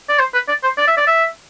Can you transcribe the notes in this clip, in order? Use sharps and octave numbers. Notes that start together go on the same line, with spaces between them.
D5
C5
B4
D5
C5
D5
E5
D5
E5